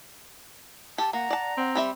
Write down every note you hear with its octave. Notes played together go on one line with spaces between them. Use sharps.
G4 A5
A#3 F#5 A#5
D5 A5
C4 F#5
G3 G4 E5 B5